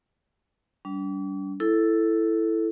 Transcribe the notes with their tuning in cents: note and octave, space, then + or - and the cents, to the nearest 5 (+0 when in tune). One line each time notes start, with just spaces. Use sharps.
G3 -20 D4 -40
E4 +5 A4 +0